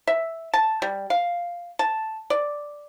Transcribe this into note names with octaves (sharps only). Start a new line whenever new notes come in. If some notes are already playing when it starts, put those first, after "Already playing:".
E5
A5
G3
F5
A5
D5